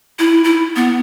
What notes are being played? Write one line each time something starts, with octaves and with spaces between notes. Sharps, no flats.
E4
E4
B3